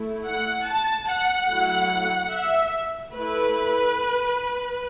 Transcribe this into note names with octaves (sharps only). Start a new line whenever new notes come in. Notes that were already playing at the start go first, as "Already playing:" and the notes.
Already playing: A3 E4
F#5
A5
F#5
F#3 A3 E4
E5
A3 E4 B4